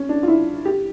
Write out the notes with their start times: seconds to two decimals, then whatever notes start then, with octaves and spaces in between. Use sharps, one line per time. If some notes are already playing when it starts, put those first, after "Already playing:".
Already playing: C#4
0.09 D4
0.23 F4
0.28 E4
0.65 G4